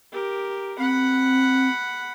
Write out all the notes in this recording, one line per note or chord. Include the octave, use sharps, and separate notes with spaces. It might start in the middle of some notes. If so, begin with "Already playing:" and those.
G4 A#4
C4 F#5 B5